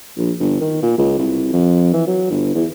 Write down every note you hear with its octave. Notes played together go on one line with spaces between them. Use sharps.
A#1
G1
D#3
A#2
C#2
C2
F2
E3
F#3
G1
E2